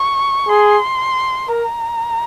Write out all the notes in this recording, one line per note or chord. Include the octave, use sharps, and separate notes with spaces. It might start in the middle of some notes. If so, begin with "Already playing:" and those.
Already playing: C#6
G#4 C6
A#4 A#5